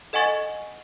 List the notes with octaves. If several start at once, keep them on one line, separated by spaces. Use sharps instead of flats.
A4 D#5 F#5 G#5 C#6 A6